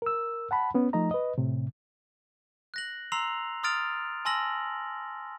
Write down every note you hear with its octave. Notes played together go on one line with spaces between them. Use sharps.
A#4 E6
F#5 A5 B5
B3 C#4
F3 A3 D#4 D#5 A#5
B4 D#5
A2 C3
F#6 A#6 F#7
A#5 C6 E6 C7 F7 F#7
C6 D#6 F6 A6 D7 F7
G#5 A5 C6 E6 A#6 F#7